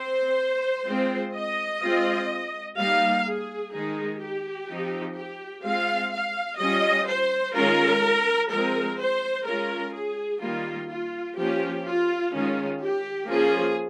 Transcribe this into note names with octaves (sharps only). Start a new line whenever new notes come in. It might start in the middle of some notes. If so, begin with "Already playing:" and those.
Already playing: C4 C5
G#3 C4 F4
D#5
G#3 C4 F4
G3 A#3 D#4 F5
G#4
D#3 G#3 D#4 G#4
G4
F3 C4 D#4
G4
G#3 C4 F4 F5
F5
G3 C#4 F4 D#5
C5
D#3 G#3 C#4 F4 A#4
F3 G#3 C4 A#4
C5
G#3 C#4 F4 A#4
G#4
D#3 G3 A#3 F4
F4
F3 A#3 C#4 F4 G4
F4
D#3 G#3 C#4 F4
G4
F3 A#3 C#4 F4 G#4